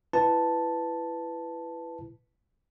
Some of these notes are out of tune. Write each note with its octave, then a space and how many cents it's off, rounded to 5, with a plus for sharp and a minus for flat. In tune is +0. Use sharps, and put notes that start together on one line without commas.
E4 +20 B4 +5 A5 +0